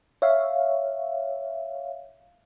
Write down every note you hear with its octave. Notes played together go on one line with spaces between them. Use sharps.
C#5 E5 F5